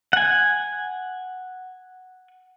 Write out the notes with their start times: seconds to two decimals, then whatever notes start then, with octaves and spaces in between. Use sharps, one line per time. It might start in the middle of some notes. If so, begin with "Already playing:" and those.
0.13 F#5 G#5